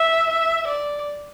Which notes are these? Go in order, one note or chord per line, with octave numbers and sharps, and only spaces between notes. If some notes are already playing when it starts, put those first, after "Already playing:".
Already playing: E5
E5
D5